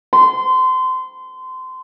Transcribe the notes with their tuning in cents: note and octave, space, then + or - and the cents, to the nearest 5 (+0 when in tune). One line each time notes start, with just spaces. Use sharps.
C6 -25